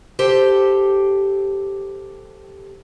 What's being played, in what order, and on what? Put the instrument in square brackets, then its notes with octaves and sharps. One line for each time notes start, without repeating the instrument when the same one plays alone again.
[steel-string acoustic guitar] G4 A4 C5